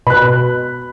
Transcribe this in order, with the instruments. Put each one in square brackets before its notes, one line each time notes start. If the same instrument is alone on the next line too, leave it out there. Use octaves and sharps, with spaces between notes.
[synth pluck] B2 [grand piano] B5 F#6